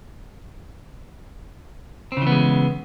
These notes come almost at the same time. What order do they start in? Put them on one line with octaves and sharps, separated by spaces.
C4 C#3 E3 B3 G#3